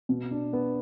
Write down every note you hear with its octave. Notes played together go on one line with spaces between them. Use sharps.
B2
D4
B3